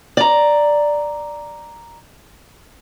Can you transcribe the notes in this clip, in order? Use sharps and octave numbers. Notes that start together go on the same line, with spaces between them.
D5 A#5